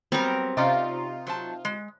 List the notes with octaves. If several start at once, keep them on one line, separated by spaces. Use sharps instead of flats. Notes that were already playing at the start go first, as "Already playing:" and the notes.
F#3 G3 B3 C4 A#4
C3 C#4 D#4 F4 D5
F#3 C5 A5
G#3